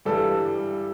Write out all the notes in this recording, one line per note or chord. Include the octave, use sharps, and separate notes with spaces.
G2 E3 G3 A4